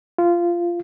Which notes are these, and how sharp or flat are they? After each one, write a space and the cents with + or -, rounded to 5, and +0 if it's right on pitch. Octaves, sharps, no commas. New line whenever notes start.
F4 -15